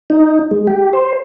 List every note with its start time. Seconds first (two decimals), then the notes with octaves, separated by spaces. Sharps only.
0.10 D#4
0.51 G#3
0.67 G4
0.93 C5